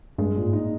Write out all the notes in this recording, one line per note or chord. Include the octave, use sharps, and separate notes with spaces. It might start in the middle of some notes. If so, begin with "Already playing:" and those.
G2 G#3
A#2
G#2
D#4